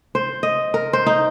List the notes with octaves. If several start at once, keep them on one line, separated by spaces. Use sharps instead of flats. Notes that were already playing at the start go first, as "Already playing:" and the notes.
C5
D#5
A#4
C5
D#4